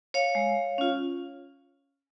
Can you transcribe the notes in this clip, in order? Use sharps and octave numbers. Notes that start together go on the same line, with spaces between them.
C#5 F5
G#3
C#4 F4